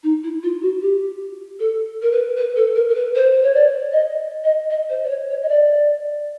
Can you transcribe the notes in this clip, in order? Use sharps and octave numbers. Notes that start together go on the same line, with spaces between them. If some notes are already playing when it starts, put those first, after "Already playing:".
D#4
E4
F4
F#4
G4
A4
A#4
B4
B4
A4
A#4
A#4
B4
C5
C#5
D5
D#5
D#5
D#5
C5
D5
C#5
C#5
D#5
D5